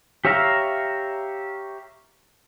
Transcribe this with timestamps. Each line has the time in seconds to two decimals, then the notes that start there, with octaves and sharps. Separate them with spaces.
0.25 G4 C#5 E5 F5 A#5